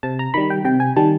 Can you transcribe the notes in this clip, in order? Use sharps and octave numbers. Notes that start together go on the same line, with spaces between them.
C3 A5
A#5
D#3 G3 B5
G5
C3 G5
G#5
D#3 G3 A5